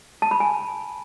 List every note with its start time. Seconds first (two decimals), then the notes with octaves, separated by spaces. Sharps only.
0.22 A5
0.31 B5
0.40 G#5